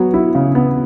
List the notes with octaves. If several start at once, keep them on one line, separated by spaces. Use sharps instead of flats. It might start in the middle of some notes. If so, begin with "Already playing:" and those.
Already playing: F#3 B3
E4
C#3
B3